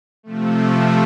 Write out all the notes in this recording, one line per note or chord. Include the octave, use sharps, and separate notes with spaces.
C3 F3 A3